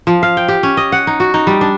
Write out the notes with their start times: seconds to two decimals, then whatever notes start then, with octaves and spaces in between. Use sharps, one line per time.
0.07 F3
0.23 F5
0.37 G5
0.48 G4
0.63 C#4
0.77 D#5
0.92 F#5
1.07 D#4
1.20 F#4
1.34 D#4
1.47 G3
1.61 D4